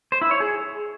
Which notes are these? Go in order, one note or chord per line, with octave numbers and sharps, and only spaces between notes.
C5
E4
C#5
G#4